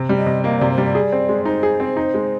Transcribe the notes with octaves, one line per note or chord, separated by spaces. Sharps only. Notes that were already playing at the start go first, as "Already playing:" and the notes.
Already playing: C3
G3
D#5
C3
A#3 D#5
C3 D5
C5
G3
D5
G#4
C4
G#3
D#4 C5
G#4
C4
D#4
G#3